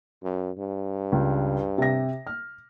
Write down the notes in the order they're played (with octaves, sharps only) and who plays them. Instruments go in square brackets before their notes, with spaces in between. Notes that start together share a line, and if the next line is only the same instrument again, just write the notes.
[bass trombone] F#2
G2
[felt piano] C#2
C3 A#6
F6